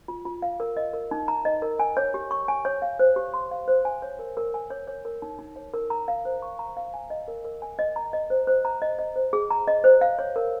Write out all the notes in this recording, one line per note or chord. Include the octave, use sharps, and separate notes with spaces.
F4
F4
F5
A#4
D#5
A#4
D#4
A#5
D#5
A#4
G#5
C#5
G4
C#6
G#5
C#5
F5
C5
G4
C6
F5
C5
G#5
C#5
A#4
A#4
G#5
C#5
C#5
A#4
D#4
D#4
C#5
A#4
A#5
F5
C5
C#6
A#5
F5
G#5
D#5
A#4
A#4
G#5
D#5
A#5
D#5
C5
C5
A#5
D#5
D#5
C5
G#4
A#5
D#5
C5
F5
C#5
A#4